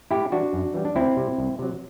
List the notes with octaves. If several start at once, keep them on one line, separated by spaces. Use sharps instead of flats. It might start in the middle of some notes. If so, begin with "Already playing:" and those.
A2 E4 G4
E3 G3 D4 F#4
F#2
E3 G3
D4
D2 C4 E4
C3 G3
C2
C3 F#3